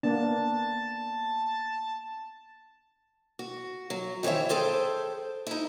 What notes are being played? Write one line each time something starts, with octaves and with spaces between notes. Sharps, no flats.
A#3 B3 D4 A5
F#4
F#3
D#3 E3 C5 C#5 E5
G#4 A4 C5 G5
D#4 E4